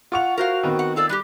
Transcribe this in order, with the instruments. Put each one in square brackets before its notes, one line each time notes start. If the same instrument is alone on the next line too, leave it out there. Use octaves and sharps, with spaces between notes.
[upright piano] F4 C#6 F7 [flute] F#5
[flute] F#4 [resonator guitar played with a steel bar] A#4 C5 F5
[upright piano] D#3 B3 C4
[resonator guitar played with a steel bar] F#5
[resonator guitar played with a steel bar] F4 A4 D5 [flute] E6
[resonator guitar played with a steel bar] G3 F#4 G4 [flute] F#6